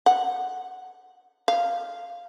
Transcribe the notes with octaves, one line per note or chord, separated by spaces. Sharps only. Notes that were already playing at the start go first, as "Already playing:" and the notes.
F#5
F5